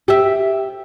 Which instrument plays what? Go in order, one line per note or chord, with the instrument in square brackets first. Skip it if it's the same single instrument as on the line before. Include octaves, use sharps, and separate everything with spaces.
[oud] G4 E5